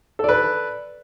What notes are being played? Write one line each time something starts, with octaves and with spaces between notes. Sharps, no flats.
A4 B4 D5